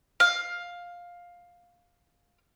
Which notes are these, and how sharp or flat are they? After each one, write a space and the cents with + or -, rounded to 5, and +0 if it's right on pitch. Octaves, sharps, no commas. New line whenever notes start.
F5 +10